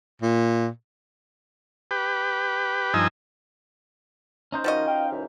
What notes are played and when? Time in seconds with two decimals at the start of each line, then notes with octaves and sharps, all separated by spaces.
0.22 A#2
1.91 G4 B4
2.94 G2 F3 D#4 D#5 G#5 E6
4.52 C#4 D#4 C5
4.64 D#3 F3 F#4 D#5
4.87 F5 G5
5.11 C#2 F#2 E3